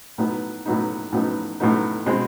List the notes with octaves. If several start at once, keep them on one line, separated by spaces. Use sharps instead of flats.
A2 F#3 B3 D#4
A2 F#3 B3 D#4
A2 F#3 B3 D#4
A2 F#3 B3 D#4
B2 G#3 C4